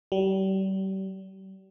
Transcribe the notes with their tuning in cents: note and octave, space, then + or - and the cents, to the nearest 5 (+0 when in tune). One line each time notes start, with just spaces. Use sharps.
G3 -35